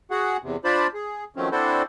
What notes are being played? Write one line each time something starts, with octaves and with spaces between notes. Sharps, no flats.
F#4 G#4 F#5
E2 C3
D4 F4 C5 D5 A5 B5
G#4
D#3 F3 F#3 A3 C4 C#4
C4 D4 E4 F#4 A4 C5